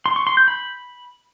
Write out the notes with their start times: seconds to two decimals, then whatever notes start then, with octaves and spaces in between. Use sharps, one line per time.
0.06 C6
0.16 C#6
0.27 C6
0.37 G6
0.48 B5